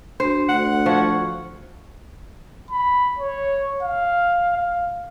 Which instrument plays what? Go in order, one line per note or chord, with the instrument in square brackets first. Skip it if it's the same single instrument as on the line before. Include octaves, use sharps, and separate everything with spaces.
[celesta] D4 F#4 [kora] C5
[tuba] D2 [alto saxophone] F#5
[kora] F3 [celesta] C#6 G#6
[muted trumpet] B5
C#5
F5
F5